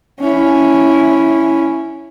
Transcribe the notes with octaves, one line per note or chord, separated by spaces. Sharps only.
C#4 E4